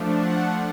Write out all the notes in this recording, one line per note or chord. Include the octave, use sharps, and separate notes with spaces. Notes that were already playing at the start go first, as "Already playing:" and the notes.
Already playing: F3 A3 D4
F#5